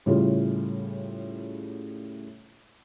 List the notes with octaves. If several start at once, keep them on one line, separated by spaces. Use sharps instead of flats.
A2 C#3 G3 F4 G#4